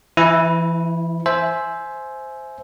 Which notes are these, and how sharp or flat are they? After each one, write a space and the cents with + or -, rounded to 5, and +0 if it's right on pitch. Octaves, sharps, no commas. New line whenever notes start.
E3 +30 E4 -15
C5 +0 E5 +0 G#5 +20